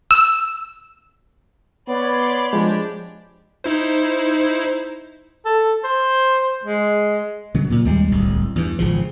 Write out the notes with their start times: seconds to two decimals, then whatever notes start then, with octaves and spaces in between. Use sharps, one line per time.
0.11 E6
1.88 B3 C#5 D5 B5 C6
2.53 F3 G#3 D4 G4
3.64 D#4 E4 C5
5.46 A4
5.84 C5
6.65 G#3
7.54 C#3 F#3
7.70 A#2
7.85 D#2 G3 G#3
8.11 D1 C2
8.56 E2 G2
8.79 G#1 C#3 F3